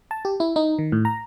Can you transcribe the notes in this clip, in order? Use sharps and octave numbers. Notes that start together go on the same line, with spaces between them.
A5
G4
E4
D#4
D#3
A2
A#5